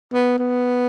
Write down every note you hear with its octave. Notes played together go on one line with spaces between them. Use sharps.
B3
B3